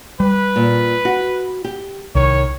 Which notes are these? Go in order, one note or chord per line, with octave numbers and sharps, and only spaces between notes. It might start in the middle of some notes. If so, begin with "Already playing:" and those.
G3 B4
A#2
F#4
G4
C2 D#3 C#5